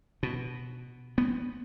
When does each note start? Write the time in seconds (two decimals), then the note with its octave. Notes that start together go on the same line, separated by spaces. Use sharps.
0.23 B2
1.18 B3